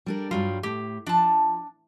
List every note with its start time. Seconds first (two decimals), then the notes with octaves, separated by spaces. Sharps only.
0.06 G3 D4 A#4
0.31 G2 F#3 G3 F4
0.63 A2 G4
1.06 F3 D4 A5